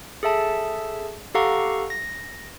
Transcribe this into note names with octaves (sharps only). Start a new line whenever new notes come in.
G#4 A4 E5 A5
G4 A4 F5 F#5 A#5 C#6
A#6